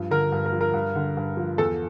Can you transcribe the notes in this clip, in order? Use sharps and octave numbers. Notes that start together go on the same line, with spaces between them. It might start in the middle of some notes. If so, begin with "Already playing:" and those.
Already playing: G2 F3
D3 A#4
G2
A#4
F3
A#4
G2
D3
G2
F3
E2 A4